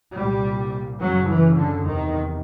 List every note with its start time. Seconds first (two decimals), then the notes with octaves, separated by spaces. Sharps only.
0.14 C2 A#2 G3
1.00 F#2 C#3 F#3
1.28 E3
1.56 D3
1.85 E2 C3 D#3